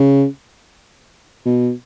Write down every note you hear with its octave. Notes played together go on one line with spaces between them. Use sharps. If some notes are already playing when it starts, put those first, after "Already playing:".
Already playing: C#3
B2